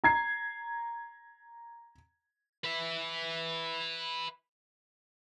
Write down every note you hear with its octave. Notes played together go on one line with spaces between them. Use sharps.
A#5 G#6 C7
B4 E5